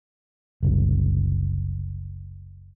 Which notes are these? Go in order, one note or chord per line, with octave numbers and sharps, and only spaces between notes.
F#1 C2